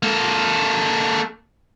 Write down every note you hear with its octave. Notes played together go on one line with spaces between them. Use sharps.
A#3 A4